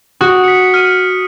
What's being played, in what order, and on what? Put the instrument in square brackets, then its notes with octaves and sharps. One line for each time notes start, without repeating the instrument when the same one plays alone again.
[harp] F#4 [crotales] D#6
[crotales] B6 C#7
F6 D#7